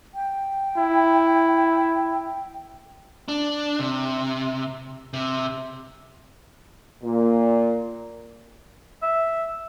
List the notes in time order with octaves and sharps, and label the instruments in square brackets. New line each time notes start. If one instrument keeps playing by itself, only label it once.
[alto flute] G5
[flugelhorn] E4
[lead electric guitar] D4
C3
C3
[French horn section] A#2
[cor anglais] E5